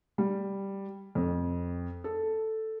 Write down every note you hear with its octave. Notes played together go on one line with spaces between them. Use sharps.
G3
F2
A4